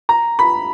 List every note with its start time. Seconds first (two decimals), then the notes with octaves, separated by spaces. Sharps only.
0.09 A#5
0.39 B5